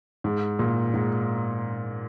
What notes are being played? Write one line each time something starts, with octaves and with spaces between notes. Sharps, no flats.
G#2
A#2
G#2